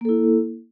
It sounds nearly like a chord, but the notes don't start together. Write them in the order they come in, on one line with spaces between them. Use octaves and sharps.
A#3 A4 E4